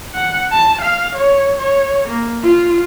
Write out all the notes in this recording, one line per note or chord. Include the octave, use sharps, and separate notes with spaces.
F#5
A5
F5
C#5
C#5
A#3
F4